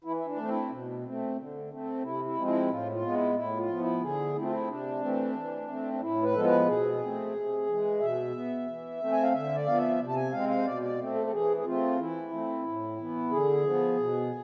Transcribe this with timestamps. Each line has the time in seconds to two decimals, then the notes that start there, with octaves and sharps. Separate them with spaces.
0.04 E3 E4
0.17 E4
0.27 D4
0.36 A3 C4
0.48 E4
0.71 B2
1.04 A3 C4
1.36 D3
1.70 A3 C4
2.03 C3 E4
2.25 E4
2.36 F3 G#3 C4
2.47 E4
2.70 A2 F4
2.85 E4
2.92 F4
3.02 G#3 B3
3.13 E4
3.35 A2 E4
3.57 F4
3.68 F3 B3
3.79 E4
4.02 D3 G#4
4.35 A3 C4 E4
4.43 F4
4.52 E4
4.68 C3 D4
5.01 E3 A3 C4
5.34 E3
5.68 A3 C4
5.93 D4
6.01 A2 E4
6.23 B4
6.34 F3 G#3 B3 A4
6.45 B4
6.67 B2 G#4
7.00 A3 C4
7.33 C3
7.66 E3 G#3
7.99 B2 E5
8.33 B3
8.67 E3
9.00 A3 C4
9.12 G#5
9.23 F5
9.32 D3 E5
9.55 D5
9.66 F3 B3 F5
9.77 E5
9.99 C3
10.07 A5
10.16 G#5
10.32 G#3 C4 F5
10.49 F5
10.58 C5
10.65 B2 D5
10.82 D5
10.98 A3 C4
11.15 A4
11.27 A4
11.31 E3 G#4
11.57 G#4
11.65 A3 C4 F4
11.98 E3 E4
12.31 A3 C4
12.65 A2
12.98 E3 B3
13.31 D3 G#4
13.63 F3 B3
13.97 B2